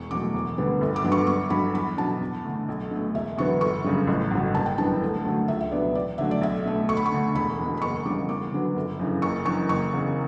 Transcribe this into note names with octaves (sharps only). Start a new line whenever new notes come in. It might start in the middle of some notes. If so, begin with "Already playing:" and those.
Already playing: E1 C#6
E2 B2 F#3 A3 D6
E1
D2 D3 G3 B3
G1
D6
G2 F#3 B3
C#6
G1 C#6
G2 F#3 B5
E2 B5
B2 F#3 A5
E2
D3 A3
B1
B2 A3
E1 E5
E2 D3 F#3 B3 C#6
G1 C#6
F#2 C#3 G3
A1
G2 D3 F#3
F#1 A5
G5
F#2 E3 G3 B3 A5
D2
D3 F#3 A3
C#2 E5
E5
B2 F#3 B3 D5
E2 D5
D3 F#3 A3 E5
D5
B1 E5
B2 A3
D2 C#6
B5
C#6
D3 A3
E1 B5
E2 B2
B5
F#1 C#6
E2 C#3 G3 D6
E2 D6
D3 F#3 B3
G1
F#2 C#3 E3
F#1 C#6
F#2 E3 C#6
F#1 C#6
E2 C#3